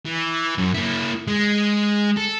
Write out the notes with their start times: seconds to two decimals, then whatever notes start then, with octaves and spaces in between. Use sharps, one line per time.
0.06 E3
0.58 F#2
0.74 A#3 E4
1.27 G#3
2.17 A4